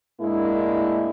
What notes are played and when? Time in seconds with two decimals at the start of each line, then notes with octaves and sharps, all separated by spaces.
0.20 A2 G#3 A#3 D4 E4